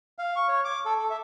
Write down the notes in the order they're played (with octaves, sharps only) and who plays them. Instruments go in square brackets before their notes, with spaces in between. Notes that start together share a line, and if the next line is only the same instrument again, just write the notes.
[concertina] F5
C#6
C#5
D6
A4
A4
E5